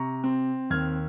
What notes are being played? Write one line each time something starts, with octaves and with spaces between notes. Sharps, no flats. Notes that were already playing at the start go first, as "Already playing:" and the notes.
Already playing: C3 A#5 C#6
C4
D#2 F6 G#6